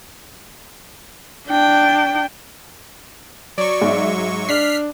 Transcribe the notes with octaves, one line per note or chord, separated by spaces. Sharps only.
D4 G5
F#3 D5 C#6
G#2 E5
D4 F6 B6 C7